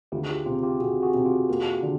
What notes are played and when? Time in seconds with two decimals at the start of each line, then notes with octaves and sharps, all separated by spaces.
0.12 D2 F4 G4
0.23 G#4
0.29 F4 G4
0.46 C3 F4 G4
0.63 F4 G4
0.80 C3 F#4 G#4
1.03 F#4 G#4
1.14 C3
1.25 F4 G4
1.49 A#3
1.83 D3